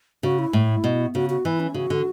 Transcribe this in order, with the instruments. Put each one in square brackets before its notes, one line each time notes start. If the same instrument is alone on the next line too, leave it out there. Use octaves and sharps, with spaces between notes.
[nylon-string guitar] C#3 [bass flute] F#4
[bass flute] E4
[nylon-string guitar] A2
B2
[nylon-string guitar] C#3 [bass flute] F#4
[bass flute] F#4
[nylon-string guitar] E3 [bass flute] E4
[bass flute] C#4
[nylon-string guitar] C#3 [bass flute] F#4
[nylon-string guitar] D3